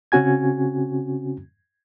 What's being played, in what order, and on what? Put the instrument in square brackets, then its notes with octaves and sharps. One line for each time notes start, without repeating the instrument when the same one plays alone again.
[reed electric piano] C#3 C4 C#4 F#4 G#5 G#6